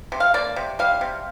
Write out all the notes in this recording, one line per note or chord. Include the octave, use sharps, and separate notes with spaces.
C3
F5
A#3 D5
C3
G3 F5
C3